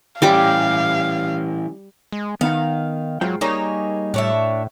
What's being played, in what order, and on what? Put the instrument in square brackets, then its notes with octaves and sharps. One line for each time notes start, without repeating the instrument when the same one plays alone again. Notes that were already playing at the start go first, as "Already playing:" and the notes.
[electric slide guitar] E3 C#4 E4 [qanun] G3 G4 D6 [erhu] F5
[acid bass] G#3
[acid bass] D#3 [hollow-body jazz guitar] B3 D#4 F#5 [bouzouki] F5
[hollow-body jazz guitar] G#2 F4 G5 [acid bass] F#3
[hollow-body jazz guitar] G3 A#5 [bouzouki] A#3 G#4 C#5 [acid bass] D#4
[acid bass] A2 [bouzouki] D4 C#5 E5